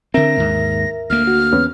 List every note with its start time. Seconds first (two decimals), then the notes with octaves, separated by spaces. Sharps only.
0.14 D3 C4 A#4 E5 A#6
0.38 D#2 G#2
1.10 D2 A#3 F6
1.27 F#4
1.53 E2 B3 C#4